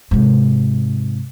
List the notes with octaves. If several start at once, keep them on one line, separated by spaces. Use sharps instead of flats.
G#2 C3